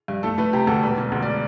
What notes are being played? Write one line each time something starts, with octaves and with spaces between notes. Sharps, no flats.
G2
A3 A4
A3 B4
C3 G4
D2 A4
E1 B4
E1
D2
D5